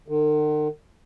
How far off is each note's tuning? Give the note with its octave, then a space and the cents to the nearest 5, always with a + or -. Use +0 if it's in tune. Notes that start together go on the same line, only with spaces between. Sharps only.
D#3 -45